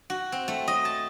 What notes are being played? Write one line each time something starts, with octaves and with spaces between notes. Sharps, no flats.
F#4
C4
A3
D#5
A5